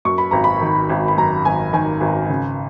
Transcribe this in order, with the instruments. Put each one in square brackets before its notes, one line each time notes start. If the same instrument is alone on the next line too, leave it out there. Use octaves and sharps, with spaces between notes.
[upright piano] F#2 C#6
B5
G#1 A#5
B5
D#3
G#1
B5
F#2 A#5
G#1 G#5
D#3 G#5
G#1
C#3